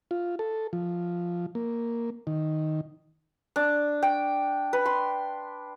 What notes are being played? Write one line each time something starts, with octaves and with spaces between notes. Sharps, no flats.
F4
A4
F3
A#3
D#3
D4
G5
B4
C6